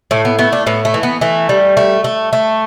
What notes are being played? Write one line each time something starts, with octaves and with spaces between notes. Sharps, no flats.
A2 A3
B3
A3 B3
D4
A2 B3
A3
E3
B3
E3 A3
G3
A3
A3
A3